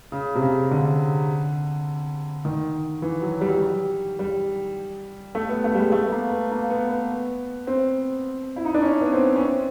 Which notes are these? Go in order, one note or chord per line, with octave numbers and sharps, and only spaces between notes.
C#3
C3
C#3
D3
D#3
E3
F#3
G3
F#3
G3
G3
A3
B3
A3
G3
G#3
A3
B3
A#3
B3
A#3
B3
B3
C4
E4
D#4
D4
C#4
B3
C4
C#4
C4